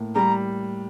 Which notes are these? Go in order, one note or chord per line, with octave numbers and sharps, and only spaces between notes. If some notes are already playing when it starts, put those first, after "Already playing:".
Already playing: A2 A#3
G3 A#5